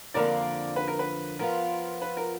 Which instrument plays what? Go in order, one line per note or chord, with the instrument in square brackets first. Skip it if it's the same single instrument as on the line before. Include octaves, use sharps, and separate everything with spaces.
[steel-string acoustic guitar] F2 D3 F3 A#3 [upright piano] A#4 D5
[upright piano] B4
A#4
B4
[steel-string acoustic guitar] F3 B3 F4 [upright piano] A#4
[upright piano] B4
A#4